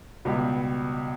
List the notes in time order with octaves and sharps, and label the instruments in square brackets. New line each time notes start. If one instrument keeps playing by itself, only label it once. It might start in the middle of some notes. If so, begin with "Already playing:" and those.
[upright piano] C#2 B2 G3 B3